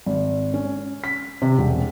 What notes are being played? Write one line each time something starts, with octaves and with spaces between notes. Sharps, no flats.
G#1
C#4
B6
C3
E1